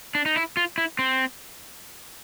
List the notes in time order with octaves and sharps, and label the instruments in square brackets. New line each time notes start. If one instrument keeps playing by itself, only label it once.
[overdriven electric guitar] D4
D#4
E4
F4
E4
C4